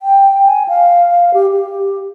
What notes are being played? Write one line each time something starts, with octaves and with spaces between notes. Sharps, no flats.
G5
G#5
F5
G4
G4